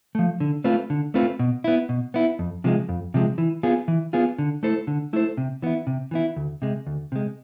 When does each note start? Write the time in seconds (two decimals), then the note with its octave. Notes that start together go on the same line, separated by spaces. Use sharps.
0.15 F3 A3
0.40 D3
0.64 A3 C4 F4 B4
0.90 D3
1.14 A3 C4 F4 B4
1.39 B2
1.64 B3 E4
1.89 B2
2.14 B3 E4
2.39 F2
2.64 C3 F3 G#3
2.89 F2
3.14 C3 F3 G#3
3.38 E3
3.63 B3 F4 G#4
3.88 E3
4.13 B3 F4 G#4
4.39 D3
4.63 A3 E4 A4 C5
4.87 D3
5.13 A3 E4 A4 C5
5.37 C3
5.62 E3 B3 E4
5.87 C3
6.11 E3 B3 E4
6.36 D2
6.62 C3 G#3
6.86 D2
7.12 C3 G#3